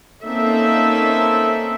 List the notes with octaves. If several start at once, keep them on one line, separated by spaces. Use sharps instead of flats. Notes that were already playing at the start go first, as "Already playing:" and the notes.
A#3 C4 C#4 D#4 A4 E5